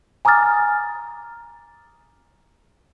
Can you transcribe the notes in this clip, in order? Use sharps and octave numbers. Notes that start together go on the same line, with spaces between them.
G#5 A#5 D6 D#6 F6 A6